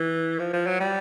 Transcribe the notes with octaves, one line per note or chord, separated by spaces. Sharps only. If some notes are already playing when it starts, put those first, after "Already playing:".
Already playing: E3
F3
F3
F#3
G3